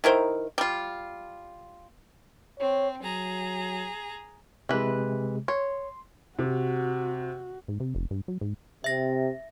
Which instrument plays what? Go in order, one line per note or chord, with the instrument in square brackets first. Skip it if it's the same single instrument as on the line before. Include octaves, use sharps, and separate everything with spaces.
[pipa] D#3 E4 A#4 C5
G3 F4
[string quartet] C4 [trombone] C#5
[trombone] F#3 [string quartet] G#4 A#5
[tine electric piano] C3 G#3 [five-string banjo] E3 B4
[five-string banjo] C#5 [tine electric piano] C6
[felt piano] C3 [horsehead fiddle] F#4
[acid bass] G#2
C3
F1
G2
F#3
G#2
[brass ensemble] C3 [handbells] E5 A#6